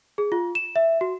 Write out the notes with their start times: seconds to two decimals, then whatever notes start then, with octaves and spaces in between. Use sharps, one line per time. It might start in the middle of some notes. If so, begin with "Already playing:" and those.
0.18 G#4
0.32 F4
0.55 E7
0.76 E5
1.01 F#4